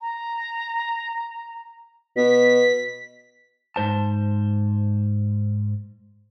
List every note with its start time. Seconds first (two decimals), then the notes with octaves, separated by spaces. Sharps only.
0.01 A#5
2.17 B2 B6
3.76 G#2 C5 A5